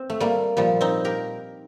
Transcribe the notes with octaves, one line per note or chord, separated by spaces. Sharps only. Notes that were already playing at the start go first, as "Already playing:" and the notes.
Already playing: C4
A3
G3 A#3
A#2 F3 G3
C4 D#4
G4 A#4